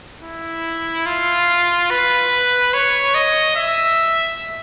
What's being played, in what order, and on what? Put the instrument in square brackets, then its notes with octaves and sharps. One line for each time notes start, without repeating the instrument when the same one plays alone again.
[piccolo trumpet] E4
F4
B4
C#5
D#5
E5